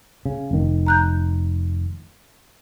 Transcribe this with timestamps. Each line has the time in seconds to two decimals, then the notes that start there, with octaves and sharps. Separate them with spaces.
0.26 C#3
0.51 F1 D#3
0.86 A#5 F#6 G6